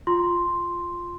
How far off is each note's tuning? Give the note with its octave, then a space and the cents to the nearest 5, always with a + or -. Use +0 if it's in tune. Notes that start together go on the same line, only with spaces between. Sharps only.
F4 +0 C6 +0